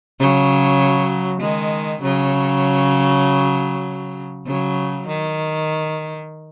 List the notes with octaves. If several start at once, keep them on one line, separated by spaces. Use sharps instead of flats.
C#3 F#3
D#3 G#3
C#3 F#3
C#3 F#3
D#3